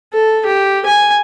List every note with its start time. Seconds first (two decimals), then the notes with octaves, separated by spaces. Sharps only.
0.13 A4
0.46 G4
0.86 G#5